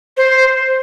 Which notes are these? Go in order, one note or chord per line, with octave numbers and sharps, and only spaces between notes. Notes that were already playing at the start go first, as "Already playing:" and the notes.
C5